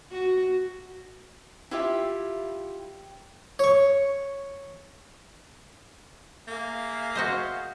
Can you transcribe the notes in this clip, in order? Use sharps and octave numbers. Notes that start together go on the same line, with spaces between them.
F#4
E4 F4 G4 E5
C#5 C#6
A#3 G#4 E5 F5
F#4 C5 D#5